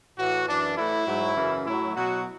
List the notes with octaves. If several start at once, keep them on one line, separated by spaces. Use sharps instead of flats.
A2 E3 F#4
F#2 E3 D4
A2 E3 E4
G#2 F#3
F#2 C#3 E3
A2 F#3 E4
B2 F#3 F#4